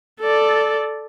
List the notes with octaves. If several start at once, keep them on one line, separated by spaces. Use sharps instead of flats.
A4 D5